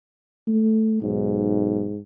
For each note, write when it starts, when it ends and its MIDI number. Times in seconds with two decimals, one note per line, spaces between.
0.48 0.98 57
1.02 1.91 35
1.02 1.99 44